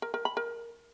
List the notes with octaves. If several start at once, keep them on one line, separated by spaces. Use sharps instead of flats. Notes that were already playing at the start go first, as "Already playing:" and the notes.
A#4
A#4
B5
A#4